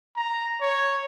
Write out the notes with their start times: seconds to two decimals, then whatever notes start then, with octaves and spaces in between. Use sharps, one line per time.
0.16 A#5
0.61 C#5